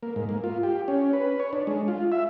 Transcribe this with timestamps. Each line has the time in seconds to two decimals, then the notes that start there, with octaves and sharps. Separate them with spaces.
0.03 A#3
0.16 G#2
0.29 A#3
0.44 F4
0.63 G4
0.88 C#4
1.13 B4
1.40 C#5
1.53 D4
1.67 G#3
1.88 F4
2.12 E5